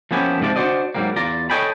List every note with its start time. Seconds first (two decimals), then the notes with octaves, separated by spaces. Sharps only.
0.11 F3 A#3 B3 C#4 E4 G4
0.40 G#2 C3 F3 D5
0.56 D4 F#4 G4 C5 D5 D#5
0.95 G#2 F#3 G3 A#3
1.16 E2 F4 D5 A#5
1.50 A4 C#5 D#5 G5 G#5 B5